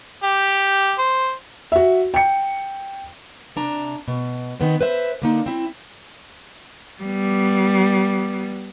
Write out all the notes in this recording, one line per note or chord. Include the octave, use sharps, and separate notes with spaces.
G4
C5
F#4 E5
G5 C#7
C3 D4 A#5
B2
D#3 B3 C4
B4 C5 E5
D3 A#3 D#4
C4 E4
G3 B3